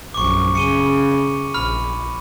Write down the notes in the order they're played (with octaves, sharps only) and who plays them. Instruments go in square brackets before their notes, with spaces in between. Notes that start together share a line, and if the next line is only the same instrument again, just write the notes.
[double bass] A#1 F#2 [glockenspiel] C#6 D6
[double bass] C#3 [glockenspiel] C#7 D#7 G7
[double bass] A#1 [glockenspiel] B5 F6